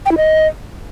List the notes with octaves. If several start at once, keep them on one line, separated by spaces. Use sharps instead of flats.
G5
E4
D#5